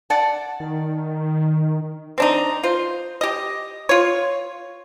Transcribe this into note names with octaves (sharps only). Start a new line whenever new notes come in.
D5 F#5 A5
D#3
C4 D4 D#4
F4 C5
G4 D#5
F4 C#5